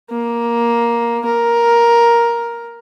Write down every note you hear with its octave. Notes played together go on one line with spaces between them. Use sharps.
A#3
A#4